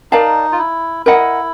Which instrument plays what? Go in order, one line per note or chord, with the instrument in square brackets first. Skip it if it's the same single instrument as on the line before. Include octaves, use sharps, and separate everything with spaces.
[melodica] D#4 [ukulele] A#4 D5 F5 A5
[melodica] F4
E4
[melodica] E4 [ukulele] A#4 D#5 F#5